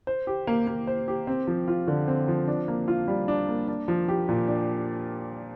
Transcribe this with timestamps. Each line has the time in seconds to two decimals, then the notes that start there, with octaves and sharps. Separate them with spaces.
0.07 C5
0.27 G4
0.47 A#3
0.67 A#3
0.87 C5
1.08 G4
1.27 C4
1.47 F3
1.68 F4
1.87 D3
2.08 C4
2.28 F3
2.48 D4
2.68 A#3
2.88 F4
3.08 G3
3.28 D4
3.48 A#3
3.68 D4
3.88 F3
4.08 G4
4.29 A#2
4.48 D4